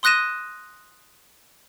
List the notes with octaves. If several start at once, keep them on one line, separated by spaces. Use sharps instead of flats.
C6 D#6 F#6 A#6 D#7 E7